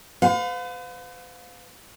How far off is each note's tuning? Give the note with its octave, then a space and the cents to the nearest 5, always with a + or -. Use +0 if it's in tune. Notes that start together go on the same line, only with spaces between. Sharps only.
B4 +45 F5 +35